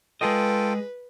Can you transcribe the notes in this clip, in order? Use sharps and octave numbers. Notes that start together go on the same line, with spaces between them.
G#3 F4 G#4 A4 B4 D#5 G5